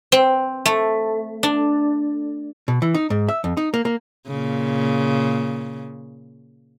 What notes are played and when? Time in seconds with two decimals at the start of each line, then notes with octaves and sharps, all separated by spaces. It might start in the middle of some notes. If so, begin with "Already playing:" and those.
0.12 C4
0.66 A3
1.43 D4
2.68 B2
2.82 E3
2.94 D#4
3.10 G#2
3.29 E5
3.44 F2
3.57 D#4
3.74 A#3
3.85 A#3
4.27 A#2 C#3